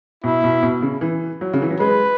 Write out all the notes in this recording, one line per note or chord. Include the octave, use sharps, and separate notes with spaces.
B2 E4
B2
B2
C#3
E3
F#3
C#3
E3
F#3
G#3 B4